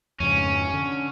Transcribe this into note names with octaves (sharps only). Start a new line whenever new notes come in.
F2 G#2 C#3 C#4
D3